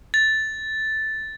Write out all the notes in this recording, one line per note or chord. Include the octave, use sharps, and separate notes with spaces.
A6